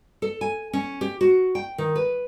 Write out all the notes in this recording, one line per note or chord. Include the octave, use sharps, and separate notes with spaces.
A4
G#5
C#4
G4
F#4
G5
D#3
B4